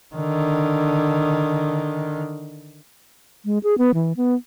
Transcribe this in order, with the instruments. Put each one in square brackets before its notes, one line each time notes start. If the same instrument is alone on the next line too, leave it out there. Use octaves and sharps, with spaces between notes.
[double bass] D3 D#3
[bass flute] G#3
G#4
B3
E3
B3